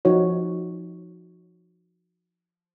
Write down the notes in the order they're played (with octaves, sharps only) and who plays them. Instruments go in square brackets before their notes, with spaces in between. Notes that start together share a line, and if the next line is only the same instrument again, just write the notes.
[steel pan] F3 D#4 F#4 C#5